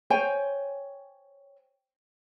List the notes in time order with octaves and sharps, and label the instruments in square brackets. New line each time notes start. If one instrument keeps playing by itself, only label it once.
[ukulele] C5 C#5 G5 G#5